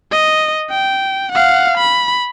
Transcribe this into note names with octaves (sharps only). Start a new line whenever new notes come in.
D#5
G5
F5 F#5
B5